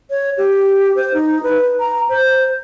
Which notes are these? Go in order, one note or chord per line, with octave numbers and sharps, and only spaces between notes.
C#5
G4
C5
D#4
B4
A#5
C5